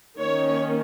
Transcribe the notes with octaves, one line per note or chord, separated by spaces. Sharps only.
D#3 A#3 C#4 C#5